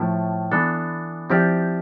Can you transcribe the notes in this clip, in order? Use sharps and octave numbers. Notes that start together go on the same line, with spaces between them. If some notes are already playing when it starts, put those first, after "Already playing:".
Already playing: A2 F3 A3 E4
E3 B3 D4 A4
F3 C4 E4 G4 D5